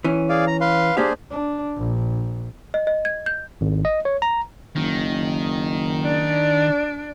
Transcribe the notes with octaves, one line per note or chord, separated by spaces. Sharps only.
E3 C#4
G#4 D5 F5
A#5
B4 F5 C6
A#3 D4 G4 G#4 C5 F5
D4
A#1
D#5
D#5
G#6
G6
G#1
D#5
C#5
A#5
F#1 D#3
D4 D5